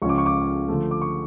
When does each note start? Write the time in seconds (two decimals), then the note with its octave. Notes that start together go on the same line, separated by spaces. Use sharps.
0.02 C#2 C#3 F3 C#4 C#6
0.09 D6
0.18 C#6
0.26 D6
0.68 D3 F3 A3
0.91 D6
1.02 C#6